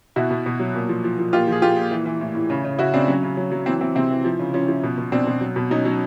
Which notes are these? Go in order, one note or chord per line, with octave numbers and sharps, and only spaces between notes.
B2 E4 F#4
B2
B2
F#3
A#2
F3
F3
F3
A#2 F4 G4
F3 G#4
A#2 F4 G4
A#2
E3
E3
A2
A2
C#3
C#3
C#3 E4 F#4
C#3 C4 D4
F#3 C#4
C#3
F#3
F#3
E3 C4
E3 C4
C3 C4
E3
F3
C#3
F3 C#4
F3
B2
B2
B2 C4 D4
B2
F#3
B2
F#3 C#4 D#4
F#3